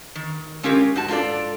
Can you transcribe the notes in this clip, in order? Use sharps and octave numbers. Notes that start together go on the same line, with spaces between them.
D#3
G#3 C#4 F4 G4 A#4
G#2 F#4 A5
G#2 D4 F4 A4 D5